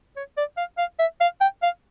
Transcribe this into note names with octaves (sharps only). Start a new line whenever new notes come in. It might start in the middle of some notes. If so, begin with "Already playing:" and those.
C#5
D5
F5
F5
E5
F5
G5
F5